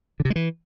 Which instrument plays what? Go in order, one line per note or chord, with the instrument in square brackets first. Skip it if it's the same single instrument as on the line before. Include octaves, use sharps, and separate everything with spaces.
[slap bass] D3
C3
G#3
E3